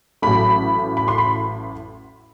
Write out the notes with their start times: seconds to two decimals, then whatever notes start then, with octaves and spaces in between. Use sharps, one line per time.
0.22 A1 A2 F#3 A3 B5
0.97 B5
1.08 C6
1.18 B5